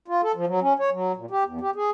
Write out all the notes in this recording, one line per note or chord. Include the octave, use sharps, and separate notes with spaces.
F4
A4
F3
F#3
C#4
C#5
F#3
A#2
G4
E2
G4
G#4